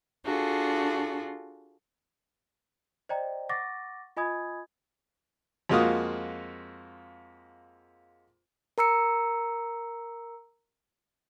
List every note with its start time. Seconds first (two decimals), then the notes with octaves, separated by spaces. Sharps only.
0.25 D4 F4 F#4 G#4 A4
3.09 C5 D5 D#5 G5 A#5
3.49 F#5 C#6 D6 A6 A#6
4.17 F4 D#5 G#5 B5 D#6 G#6
5.69 F2 G#3 A#3 F4 F#4 D#6
8.78 A#4 A#5 E6 C#7